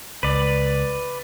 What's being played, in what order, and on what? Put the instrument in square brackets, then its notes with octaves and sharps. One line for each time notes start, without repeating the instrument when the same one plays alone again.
[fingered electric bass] C#2 [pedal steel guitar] B4 D5